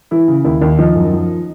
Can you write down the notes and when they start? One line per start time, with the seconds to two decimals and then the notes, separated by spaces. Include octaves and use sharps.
0.11 E3 E4
0.28 C#3
0.45 D#2 E4
0.62 D#2
0.79 F3 D#4
0.95 F#2
1.12 F3